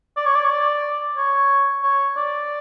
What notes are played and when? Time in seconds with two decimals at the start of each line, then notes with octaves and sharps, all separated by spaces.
0.16 D5
0.26 C#5
0.35 D5
0.45 C#5
0.50 D5
1.17 C#5
1.83 C#5
2.17 D5